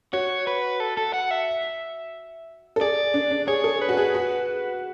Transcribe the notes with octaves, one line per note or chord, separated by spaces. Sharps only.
F#4 C#5
B4
A4
A4
F#5
E5
A4
G#4 D5
D4
D4
G#4 C#5
A4
B4
F#4
G#4
F#4